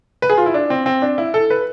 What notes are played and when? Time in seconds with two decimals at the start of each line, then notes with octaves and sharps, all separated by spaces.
0.22 B4
0.30 G#4
0.37 F4
0.46 E4
0.54 D4
0.70 C4
0.86 C4
1.02 D4
1.18 E4
1.34 A4
1.50 B4